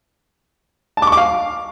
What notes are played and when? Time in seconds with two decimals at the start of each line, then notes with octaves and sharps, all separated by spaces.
0.97 A5
1.02 D6
1.07 C#6
1.12 D6
1.17 F5